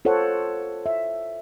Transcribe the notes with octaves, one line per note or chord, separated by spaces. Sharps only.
F4 A4 C5 C#5 F#5
E5